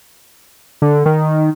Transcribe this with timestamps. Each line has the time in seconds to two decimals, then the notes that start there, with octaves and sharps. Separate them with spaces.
0.82 D3
1.06 D#3